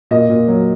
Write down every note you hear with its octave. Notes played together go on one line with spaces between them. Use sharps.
A#2 D#5
A#2
F#3